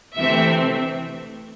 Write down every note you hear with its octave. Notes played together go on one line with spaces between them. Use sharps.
D2 C3 E3 A3 C4 E5